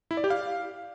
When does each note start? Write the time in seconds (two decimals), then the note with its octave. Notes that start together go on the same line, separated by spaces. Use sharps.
0.11 E4
0.17 D5
0.24 G4
0.30 F5